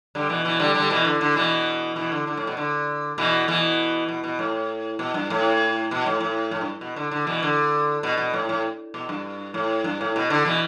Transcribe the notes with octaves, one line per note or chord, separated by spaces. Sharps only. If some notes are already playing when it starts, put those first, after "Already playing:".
D3 G3
B2 E3
B2 E3
D3 G3
D3 G3
B2 E3
D3
D3
B2 E3
B2 E3
D3
D3
A2
B2
D3
B2 E3
B2 E3
B2
B2
A2
B2
G2
A2
B2
A2
A2
A2
G2
B2
D3
D3
B2 E3
D3
B2
B2
A2
A2
B2
G2
A2
G2
A2
B2
D3
B2 E3